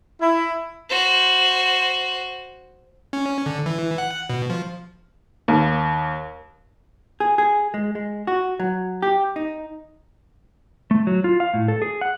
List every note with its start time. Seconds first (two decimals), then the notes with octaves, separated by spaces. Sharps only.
0.22 E4
0.90 F#4 C5
3.13 C#4
3.46 D3
3.66 E3
3.98 F#5
4.30 B2
4.50 F3
5.48 D#2
7.20 G#4
7.38 G#4
7.74 G#3
7.95 G#3
8.27 F#4
8.60 F#3
9.02 G4
9.36 D#4
10.91 A3
11.07 F#3
11.24 F4
11.40 F5
11.54 A2
11.68 A4
11.82 G#4
12.01 F#5